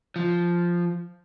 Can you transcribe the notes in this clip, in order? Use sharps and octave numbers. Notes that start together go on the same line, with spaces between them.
F3